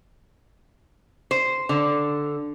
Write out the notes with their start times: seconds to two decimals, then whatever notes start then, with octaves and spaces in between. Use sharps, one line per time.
1.31 C5
1.69 D3